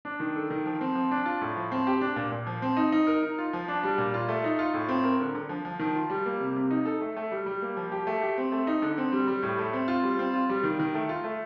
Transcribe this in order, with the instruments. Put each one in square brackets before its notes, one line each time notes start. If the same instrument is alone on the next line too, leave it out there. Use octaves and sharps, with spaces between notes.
[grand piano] D4
D#3
A4
D#3
F3
C4
F3
D4
F4
A2
F3
C4
G4
D4
A#2
A#2
F3
C4
D#4
D#4
A#4
D#4
F4
F3
D4
G3
A#2
F4
A3
D#4
F4
A2
C4
A#4
D3
D3
F3
F3
D#3
F4
G3
A#3
C3
C3
D#4
A4
A3
A3
G3
G3
A#3
F3
G4
A3
G4
C4
A3
D#4
D3
C4
G3
G3
A2
A3
C4
F4
G3
C4
F4
G3
D#3
D#3
A3
F4
A3